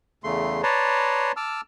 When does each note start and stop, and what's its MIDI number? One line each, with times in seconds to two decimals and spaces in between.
0.24 0.62 40
0.24 0.62 49
0.24 0.62 57
0.24 0.62 84
0.63 1.32 71
0.63 1.32 73
0.63 1.32 74
0.63 1.32 81
0.63 1.32 82
0.63 1.32 84
1.37 1.61 81
1.37 1.61 86
1.37 1.61 88
1.37 1.61 89